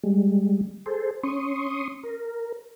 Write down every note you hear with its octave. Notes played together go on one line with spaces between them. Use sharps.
G3 G#3
G#4 A4 C5
C#4 C6 C#6 D#6
A#4